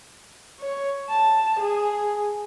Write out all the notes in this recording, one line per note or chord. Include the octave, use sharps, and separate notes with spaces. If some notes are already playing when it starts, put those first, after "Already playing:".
C#5
A5
G#4